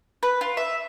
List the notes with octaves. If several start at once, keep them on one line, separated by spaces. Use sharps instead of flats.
B4
F4
E5